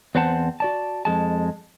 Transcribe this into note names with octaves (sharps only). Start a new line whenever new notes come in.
E2 C4 B4 C5 F#5 A5
F#4 D5 A5
F2 G#3 A5